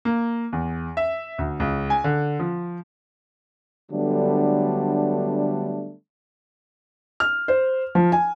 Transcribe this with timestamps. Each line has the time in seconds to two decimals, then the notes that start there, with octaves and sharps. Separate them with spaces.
0.05 A#3
0.53 E2
0.97 E5
1.39 D2
1.60 C#2
1.90 G#5
2.04 D3
2.39 F3
3.91 D3 F#3 G3 A3 B3 D4
7.20 F6
7.48 C5
7.95 F3
8.12 G#5